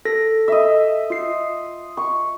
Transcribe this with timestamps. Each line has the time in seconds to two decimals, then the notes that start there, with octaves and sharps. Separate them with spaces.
0.05 A4 A#6
0.48 D#5 E5
1.10 F4 C7
1.97 C#6